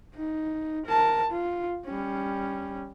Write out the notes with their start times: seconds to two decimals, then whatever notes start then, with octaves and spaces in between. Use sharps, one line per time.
0.15 D#4
0.86 A#4 A5
1.31 F4
1.86 G3 C#4